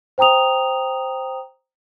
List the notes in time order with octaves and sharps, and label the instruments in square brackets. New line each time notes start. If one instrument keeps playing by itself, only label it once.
[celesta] C5 G5 A#5 D#6 F7